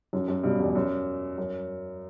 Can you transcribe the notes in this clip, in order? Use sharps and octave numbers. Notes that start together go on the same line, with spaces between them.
F#2
F#2
G2 B2
E2 G2
F#2
F#2